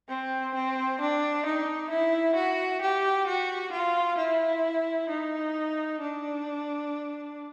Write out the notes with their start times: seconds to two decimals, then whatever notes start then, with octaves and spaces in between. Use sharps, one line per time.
0.08 C4
0.55 C4
1.00 D4
1.46 D#4
1.90 E4
2.36 F#4
2.82 G4
3.27 F#4
3.72 F4
4.18 E4
5.10 D#4
6.00 D4